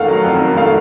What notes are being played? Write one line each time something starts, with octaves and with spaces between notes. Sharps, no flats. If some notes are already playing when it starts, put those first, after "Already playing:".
Already playing: F2 D#3 A3 F5 F#5
F#3
F2
D#3
A3 F5